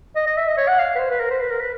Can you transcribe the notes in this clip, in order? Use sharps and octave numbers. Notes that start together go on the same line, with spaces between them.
D#5
D#5
E5
D#5
C#5
F#5
F5
B4
C5
B4
A#4
C5
B4
A#4
B4